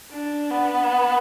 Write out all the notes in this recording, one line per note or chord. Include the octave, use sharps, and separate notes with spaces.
D4
B3